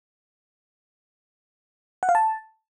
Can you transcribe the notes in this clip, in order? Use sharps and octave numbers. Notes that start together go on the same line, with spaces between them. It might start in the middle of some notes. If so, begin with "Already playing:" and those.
F#5
F5
A5